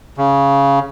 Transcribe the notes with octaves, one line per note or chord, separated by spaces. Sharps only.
C#3